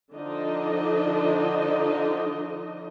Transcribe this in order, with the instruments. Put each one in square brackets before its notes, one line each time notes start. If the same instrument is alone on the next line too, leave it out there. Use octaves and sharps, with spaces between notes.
[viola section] D3 F3 D4 D#4 D#5